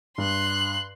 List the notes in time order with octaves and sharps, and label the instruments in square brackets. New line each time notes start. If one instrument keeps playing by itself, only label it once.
[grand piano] G2 [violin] C6 F#6